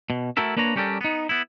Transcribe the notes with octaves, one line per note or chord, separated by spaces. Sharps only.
B2
A3 E4 F#4 A4 A#4 E5
A#3 D4 B4 C#5 A#5
G3 C#4 G4 A4 A#4 D5
B3 D#4
B3 E4